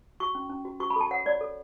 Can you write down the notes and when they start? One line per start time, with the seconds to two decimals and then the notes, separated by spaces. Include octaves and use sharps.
0.20 F#4 C#6
0.35 C#4
0.50 C#4
0.65 F#4
0.80 F#4 C#6
0.90 B5
0.96 A4 A5
1.11 C#5 F#5
1.26 C#5 D5
1.41 A4